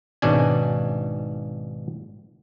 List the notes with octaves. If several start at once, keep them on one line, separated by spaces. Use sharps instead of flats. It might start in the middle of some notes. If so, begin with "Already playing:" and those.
G#1 G#2 B2 C#4 D4 G#5